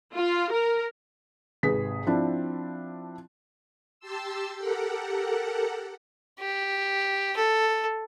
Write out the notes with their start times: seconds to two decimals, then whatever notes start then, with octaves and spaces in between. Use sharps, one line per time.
0.14 F4
0.52 A#4
1.63 G#1 C3 G#4 B4 B6
2.07 F3 C4 D4 E4
4.00 G4 A5 C6 E6
4.56 G4 A4 A#4 F#5
6.40 G4
7.37 A4